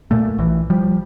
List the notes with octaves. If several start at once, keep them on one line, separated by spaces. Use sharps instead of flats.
A#2 A3
A#1 E3
F3 G3